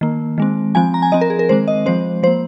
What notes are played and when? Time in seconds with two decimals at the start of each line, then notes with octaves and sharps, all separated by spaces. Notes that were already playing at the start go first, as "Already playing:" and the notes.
0.01 D#3 A#3
0.38 D#3 G#3 C4
0.75 F3 C4 G#5
0.94 A#5
1.02 G#5
1.12 F3 C4 D#5
1.21 A#4
1.30 G#4
1.39 A#4
1.49 D#3 G#3 C4 C5
1.68 D#5
1.86 F3 G#3 C4 C5
2.23 F3 A#3 C5